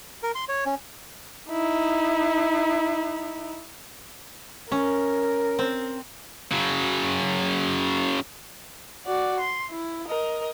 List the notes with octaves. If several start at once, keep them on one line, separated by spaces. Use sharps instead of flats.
A#4
C6
C#5
C#4
D#4 E4
C#4 A#4
C4
C#3 F#3
F#4 D5
C6
E4
A#4 D#5